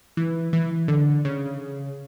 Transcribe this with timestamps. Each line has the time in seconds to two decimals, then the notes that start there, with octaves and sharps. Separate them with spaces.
0.17 E3
0.53 E3
0.88 D3
1.25 C#3